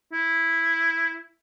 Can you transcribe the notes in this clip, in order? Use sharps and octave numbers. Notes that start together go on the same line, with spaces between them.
E4